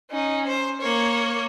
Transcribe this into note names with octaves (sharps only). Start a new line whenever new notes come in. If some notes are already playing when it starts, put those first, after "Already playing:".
C#4 D#4
C5
A#3 C#5